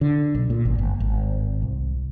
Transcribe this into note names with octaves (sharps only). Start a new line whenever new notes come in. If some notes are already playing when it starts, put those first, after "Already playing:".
D3
B1
A#2
G#1
G1
G#1
C2